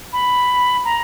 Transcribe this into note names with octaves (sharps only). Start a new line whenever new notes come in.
B5
A#5